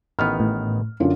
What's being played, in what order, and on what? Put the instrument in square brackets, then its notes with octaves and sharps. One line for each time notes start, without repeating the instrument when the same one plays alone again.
[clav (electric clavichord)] A1 D#3 B3 [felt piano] F6
[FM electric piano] A2
[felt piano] F#2 D3 F4